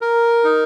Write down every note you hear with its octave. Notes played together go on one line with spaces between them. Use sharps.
A#4
D#4